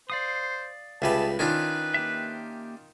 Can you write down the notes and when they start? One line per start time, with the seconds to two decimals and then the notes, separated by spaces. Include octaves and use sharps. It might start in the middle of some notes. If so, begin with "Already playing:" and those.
0.10 C5 D5 F5 D#6
1.02 C#2 G3 G4 G#4 B4 E5 A5
1.39 D#3 C#4 D4 F4 B4
1.94 A#3 G4 E5